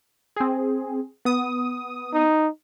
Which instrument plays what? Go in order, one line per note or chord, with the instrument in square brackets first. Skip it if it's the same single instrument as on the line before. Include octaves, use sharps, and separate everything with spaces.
[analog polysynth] C4 G#4
B3 D#6
[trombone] D#4